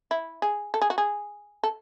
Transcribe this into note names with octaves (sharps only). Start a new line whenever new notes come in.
E4
G#4
A4
G#4
F#4
G#4
A4